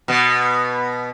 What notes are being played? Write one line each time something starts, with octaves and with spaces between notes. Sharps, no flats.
B2 B3